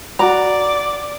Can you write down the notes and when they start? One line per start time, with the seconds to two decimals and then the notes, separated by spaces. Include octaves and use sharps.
0.19 F#4 D5 A#5